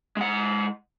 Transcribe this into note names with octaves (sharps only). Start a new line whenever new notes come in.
G#3 F#5